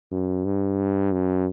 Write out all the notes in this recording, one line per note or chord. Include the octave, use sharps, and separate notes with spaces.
F#2
G2
F#2